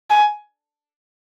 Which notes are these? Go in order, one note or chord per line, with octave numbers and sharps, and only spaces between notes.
G#5